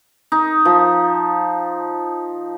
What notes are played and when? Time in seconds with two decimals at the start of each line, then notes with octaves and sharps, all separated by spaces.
0.32 D#4
0.65 F3